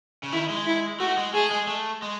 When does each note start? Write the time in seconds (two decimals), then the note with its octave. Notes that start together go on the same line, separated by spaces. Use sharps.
0.23 C#3
0.32 D#3 E4
0.50 G#3
0.67 E4
1.00 A3 F#4
1.17 G#3
1.34 A3 G#4
1.51 G#3
1.67 A3
2.02 G#3